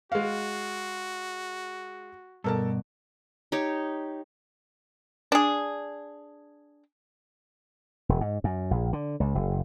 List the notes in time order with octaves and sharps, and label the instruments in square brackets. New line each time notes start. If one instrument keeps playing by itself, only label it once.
[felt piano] G#3 F5 [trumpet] F#4
[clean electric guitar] G2 B2 [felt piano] A4 A#4 A5
[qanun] D#4 G4 C#5
[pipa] D4 G#4
[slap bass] E1
G#2
F#2
A#1
D3
C#2
F#1